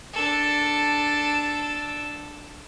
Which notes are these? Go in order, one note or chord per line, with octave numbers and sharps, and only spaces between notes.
D4 A4